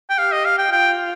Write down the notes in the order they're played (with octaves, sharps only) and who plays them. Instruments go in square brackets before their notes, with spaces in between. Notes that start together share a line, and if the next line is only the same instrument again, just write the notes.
[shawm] G5
[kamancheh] G4 [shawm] F5
[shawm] D#5
F5
G5
[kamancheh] F4 [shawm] G5